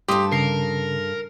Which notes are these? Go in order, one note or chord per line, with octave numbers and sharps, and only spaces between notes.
G2 G4 A4 C6 D#6
C#3 A#4 C7